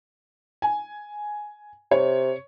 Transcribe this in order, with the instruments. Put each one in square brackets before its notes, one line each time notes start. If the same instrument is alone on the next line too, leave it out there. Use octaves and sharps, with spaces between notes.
[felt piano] G#5
[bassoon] C3 [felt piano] C#5